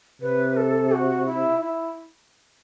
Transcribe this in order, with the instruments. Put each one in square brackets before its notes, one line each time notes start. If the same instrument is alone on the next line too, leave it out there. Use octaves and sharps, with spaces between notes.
[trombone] C3 [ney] B4
[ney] A4
F#4
E4
E4